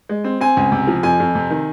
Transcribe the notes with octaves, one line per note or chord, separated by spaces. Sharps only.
G#3
C4
C4 G#5
C#2
C3
F3
F2 G#5
F2
C3
D#3